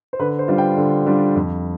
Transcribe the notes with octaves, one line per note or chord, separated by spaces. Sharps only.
C5
D3 B4
C5
G3 D4 F4
G5
D3
G3 D4 F4
F2